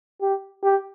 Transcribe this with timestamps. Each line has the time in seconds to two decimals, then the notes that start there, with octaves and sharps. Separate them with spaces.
0.22 G4
0.64 G4